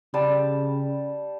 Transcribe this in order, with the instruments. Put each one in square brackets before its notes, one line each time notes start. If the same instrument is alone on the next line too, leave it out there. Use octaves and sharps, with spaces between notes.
[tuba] C#3 [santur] G3 A5